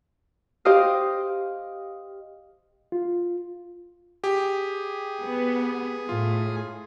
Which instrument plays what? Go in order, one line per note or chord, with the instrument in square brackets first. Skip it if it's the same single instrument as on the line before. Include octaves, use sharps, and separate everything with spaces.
[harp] G4 C5 D#5 F5
[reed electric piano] F4
[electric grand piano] G4 [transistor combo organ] G#4
[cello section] B3
[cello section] A2 [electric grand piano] F4